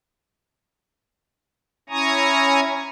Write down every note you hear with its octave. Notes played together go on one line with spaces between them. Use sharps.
C#4 E4 G#5 A#5 C#6 D#6